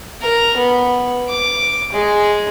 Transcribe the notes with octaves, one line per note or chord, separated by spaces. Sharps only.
A#4
B3
D6
G#3